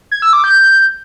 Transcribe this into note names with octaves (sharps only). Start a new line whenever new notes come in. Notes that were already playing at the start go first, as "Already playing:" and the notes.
G#6
E6
D6
G6